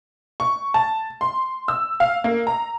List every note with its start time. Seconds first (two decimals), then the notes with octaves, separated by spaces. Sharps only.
0.40 C#6
0.74 A5
1.21 C6
1.68 E6
2.00 F5
2.24 A#3
2.47 A#5